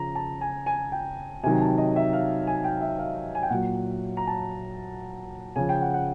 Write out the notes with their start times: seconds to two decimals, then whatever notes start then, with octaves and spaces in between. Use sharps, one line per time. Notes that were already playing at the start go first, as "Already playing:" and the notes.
Already playing: C#3 F3 A#5
0.15 A5
0.41 G#5
0.66 G#5
0.92 G5
1.44 C3 D#3 F#3 G#5
1.61 A5
1.78 D#5
1.96 E5
2.13 F5
2.47 G#5
2.64 G5
2.81 E5
2.99 F5
3.35 G#5
3.43 G5
3.50 A#2 F#3 F#5
4.17 A#5
4.27 A5
5.56 C#3 F3 G#5
5.69 G5
5.82 F#5
5.94 F#5